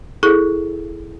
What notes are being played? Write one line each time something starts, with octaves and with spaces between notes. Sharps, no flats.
E4 G#4 A4